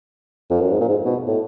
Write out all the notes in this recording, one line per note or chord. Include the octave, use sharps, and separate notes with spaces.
F2
F#2
G#2
A#2
G#2
B2
A2